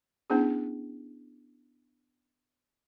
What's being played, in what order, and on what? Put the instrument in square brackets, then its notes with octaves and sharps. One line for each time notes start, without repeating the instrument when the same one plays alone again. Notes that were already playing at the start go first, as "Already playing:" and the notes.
[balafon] B3 C#4 D4 E4 G#4